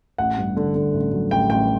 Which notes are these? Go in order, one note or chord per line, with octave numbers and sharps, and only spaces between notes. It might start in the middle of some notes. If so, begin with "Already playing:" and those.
A1 F#5
G2
D3
D3
A1
F#3
A1 G5
A1 G5